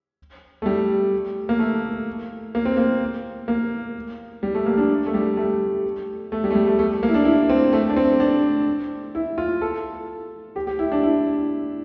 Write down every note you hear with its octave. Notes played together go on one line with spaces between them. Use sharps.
A3
G3
A#3
A3
A#3
C4
A#3
A#3
G3
A3
A#3
D4
A3
G3
A3
A3
G3
A3
G3
A3
A3
A#3
E4
D4
E4
C4
A3
D4
C4
D4
E4
F4
A4
G4
G4
E4
D4
E4